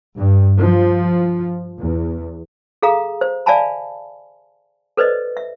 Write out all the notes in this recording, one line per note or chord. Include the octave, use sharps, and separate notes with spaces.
G2
F3
E2
G#4 A4 F5 A#5 D#6
C5
D5 E5 F5 G#5 A5 B5
A4 B4 C5 D5 D#5
E5